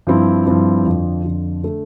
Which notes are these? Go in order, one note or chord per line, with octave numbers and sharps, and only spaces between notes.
G2 F3 C4 E4
G2 F3 C4 E4
F2 D3 F3
F2 D3 F3
D3 A3